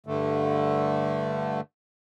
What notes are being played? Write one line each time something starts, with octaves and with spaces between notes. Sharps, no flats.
G2 D3 A3